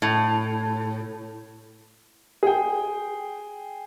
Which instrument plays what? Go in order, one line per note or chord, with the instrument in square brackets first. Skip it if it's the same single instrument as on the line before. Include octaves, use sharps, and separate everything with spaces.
[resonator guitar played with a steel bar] A2
[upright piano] G#4 G5